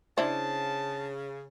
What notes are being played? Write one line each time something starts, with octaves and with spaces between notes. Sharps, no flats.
C#3 D4 E4 C5 A5